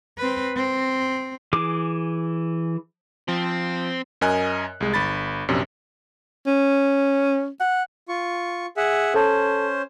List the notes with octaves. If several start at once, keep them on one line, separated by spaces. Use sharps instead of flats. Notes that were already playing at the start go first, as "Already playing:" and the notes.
C4 B4
C4
E3 G#4 D6
F3 C4
F#2 A#4 D#5 G#5 F#6
C2 G#3
G1 B5 A6
A#1 F#2 C3 D4
C#4
F#5
F4 C#6
G#4 E5 F#5
C#4 A4 C5 A5